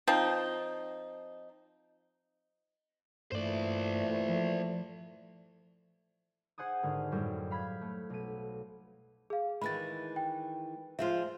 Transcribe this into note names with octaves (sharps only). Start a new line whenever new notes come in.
F3 C4 D#4
G2 A#2 E3 A3 C5 D5
F3
G#4 C5 F#5 G#5 D#6
G#1 D3 G#5 F6
F#2 A2 G3 G#3
F5 B5 G#6 B6
A3
B1 D#7
G#4 F5
D#3 E3 G#3 B5 A6
G5
F3 G#3 F4 E5